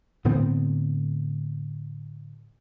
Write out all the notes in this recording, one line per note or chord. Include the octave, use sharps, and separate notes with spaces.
A2 D3 B3 C4